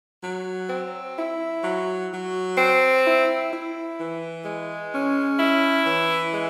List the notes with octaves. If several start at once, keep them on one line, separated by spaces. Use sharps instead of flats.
F#3
C4
E4
F#3
F#3
C4
E4
E4
E3
G#3
C#4
E4
E3
G#3